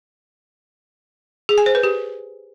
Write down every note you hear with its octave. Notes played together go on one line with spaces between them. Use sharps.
G#4
G#5
C5
B4
G4